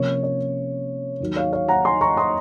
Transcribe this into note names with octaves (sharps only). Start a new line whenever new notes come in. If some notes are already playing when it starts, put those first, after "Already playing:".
Already playing: C3 F3 A#3 C#4 C#5
C#5
D#2 D#3 F#3
C#5 F5
C#5 F5
F#5 A#5
G#5 C6
A#5 C#6
C6 D#6